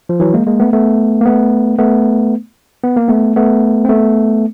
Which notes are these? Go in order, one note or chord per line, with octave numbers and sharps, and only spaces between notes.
F3
E3 F#3
G#3 A#3
G#3 A#3
A3 B3
A3 B3
A#3
A3 B3
A3 B3
B3
A#3
A3 B3
A3 B3
C4
A3 B3